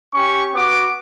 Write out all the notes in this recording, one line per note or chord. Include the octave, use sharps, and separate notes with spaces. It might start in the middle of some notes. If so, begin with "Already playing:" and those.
C#4 G4 C#6
B3 F#4 D6